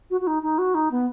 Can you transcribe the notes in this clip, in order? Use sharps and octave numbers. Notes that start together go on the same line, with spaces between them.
F#4
F#4
D#4
D#4
F#4
D#4
B3